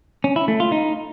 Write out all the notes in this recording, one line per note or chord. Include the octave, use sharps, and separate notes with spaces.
C#4
E4
A3
F4
D#4